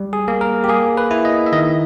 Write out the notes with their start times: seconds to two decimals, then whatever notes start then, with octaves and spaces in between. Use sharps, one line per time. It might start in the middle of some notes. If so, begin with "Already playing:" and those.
Already playing: G3
0.13 G#4
0.28 A#3
0.41 A#4
0.64 G4
0.69 A#3 G#4
0.97 B4
1.11 E4
1.25 D#5
1.46 E5
1.52 D#3 D#5